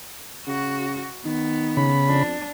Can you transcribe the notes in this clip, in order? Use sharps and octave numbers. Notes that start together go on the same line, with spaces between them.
C#3 F#4
D#3 B3
C#3 B5
F2 D4